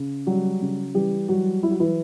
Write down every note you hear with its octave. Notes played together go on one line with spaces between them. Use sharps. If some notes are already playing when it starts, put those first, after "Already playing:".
Already playing: C#3
F#3 G3 F#4
C#3
E3 G3 G4
F#3 G3 F#4
F#3 E4
F#4
E3 E4